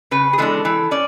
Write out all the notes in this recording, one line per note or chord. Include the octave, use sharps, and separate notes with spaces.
C#3 B4
G#4
E3 G#3 B3 D4 A4
E3 A4
C#4 D5